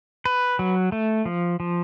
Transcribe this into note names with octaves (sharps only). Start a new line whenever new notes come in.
B4
F#3
A3
F3
F3